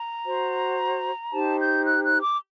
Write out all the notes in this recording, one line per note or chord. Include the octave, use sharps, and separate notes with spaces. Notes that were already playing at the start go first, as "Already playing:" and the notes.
Already playing: A#5
F#4 C5
D#4 G4 C5 A5
G6
F#6
F#6
D6